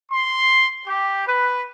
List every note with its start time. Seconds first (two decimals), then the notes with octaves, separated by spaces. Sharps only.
0.11 C6
0.87 G4
1.27 B4